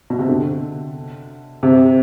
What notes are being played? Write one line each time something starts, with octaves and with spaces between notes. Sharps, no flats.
B2
C3
D3
C3